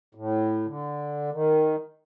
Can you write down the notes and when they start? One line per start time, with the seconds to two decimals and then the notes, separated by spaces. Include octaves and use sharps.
0.15 A2
0.66 D3
1.33 D#3